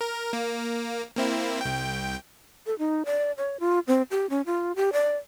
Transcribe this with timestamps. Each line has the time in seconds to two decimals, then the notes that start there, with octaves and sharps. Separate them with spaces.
0.01 A#4
0.33 A#3
1.17 A#3 C4 E4
1.61 C2 G5
2.67 A4
2.79 D#4
3.05 D5
3.38 C#5
3.60 F4
3.87 C4
4.11 G4
4.30 C#4
4.46 F4
4.76 G4
4.93 D5